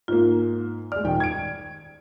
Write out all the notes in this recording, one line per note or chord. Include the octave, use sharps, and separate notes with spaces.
G#2 A#3 F4
G#3 D5 F6
D#1 D#3 G5
G#6 D7